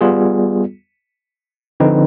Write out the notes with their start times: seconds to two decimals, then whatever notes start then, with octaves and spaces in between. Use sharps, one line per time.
0.01 G3 B3 F4 G#4
1.80 D3 F3 C4 D#4 B4